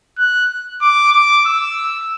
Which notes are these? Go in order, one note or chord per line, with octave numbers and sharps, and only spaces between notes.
F#6
D6
D6
E6